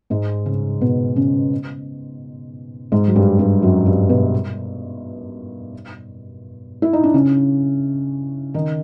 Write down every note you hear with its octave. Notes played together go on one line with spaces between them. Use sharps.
G#2 G#3
C#3 C#4
B2 B3
C#3 C#4
G#2 G#3
F#3
G2 G3
G2 G3
F#2 F#3
G2 G3
B2 B3
E4
D#4
D4
C#3 C#4
D#3 D#4